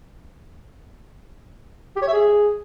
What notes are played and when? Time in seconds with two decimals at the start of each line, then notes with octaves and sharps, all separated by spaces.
1.96 G4
2.02 C#5
2.07 E5
2.13 G#4